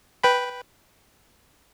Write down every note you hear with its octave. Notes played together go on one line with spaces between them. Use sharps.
B4 G5 B5